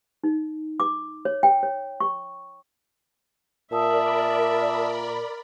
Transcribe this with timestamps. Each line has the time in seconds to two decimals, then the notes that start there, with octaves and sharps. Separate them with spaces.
0.24 D#4
0.80 D6
1.25 C#5
1.43 G5
1.63 C#5
2.00 C#6
3.72 A#2 A#4 D5 E5 A5 B5 D#6 E6